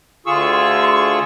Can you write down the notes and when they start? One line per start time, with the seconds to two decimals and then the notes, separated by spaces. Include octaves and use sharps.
0.26 D2 D3 F4 G#4 C#6 E6